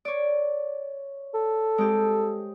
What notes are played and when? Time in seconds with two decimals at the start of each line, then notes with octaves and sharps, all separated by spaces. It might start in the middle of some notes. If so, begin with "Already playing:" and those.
0.05 C#5 D5
1.34 A4
1.78 G#3 C4 G4